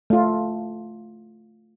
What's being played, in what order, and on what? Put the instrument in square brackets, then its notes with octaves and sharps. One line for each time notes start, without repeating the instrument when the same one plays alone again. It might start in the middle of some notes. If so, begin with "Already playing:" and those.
[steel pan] A3 F4